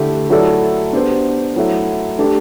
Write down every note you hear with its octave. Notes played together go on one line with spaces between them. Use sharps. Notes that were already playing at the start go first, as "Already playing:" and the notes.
Already playing: D3 A3 E4 G4
F#3 A3 E4 A4 D5
B3 D4 G4 C5
F#3 A3 E4
A3 D4 G4